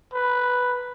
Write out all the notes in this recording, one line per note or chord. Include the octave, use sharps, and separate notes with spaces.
B4